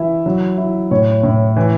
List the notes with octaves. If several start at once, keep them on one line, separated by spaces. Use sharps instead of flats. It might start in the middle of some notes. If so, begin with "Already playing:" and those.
Already playing: E3 E4 E5
F#3
E4
A2 C#5
A2
E3